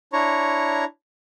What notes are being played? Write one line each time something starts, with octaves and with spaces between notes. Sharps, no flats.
D4 E4 C#5 A#5 C#6